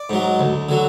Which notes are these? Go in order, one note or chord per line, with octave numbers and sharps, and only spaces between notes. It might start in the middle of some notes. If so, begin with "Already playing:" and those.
Already playing: D5
G#2 F#3
D2
D3 F#3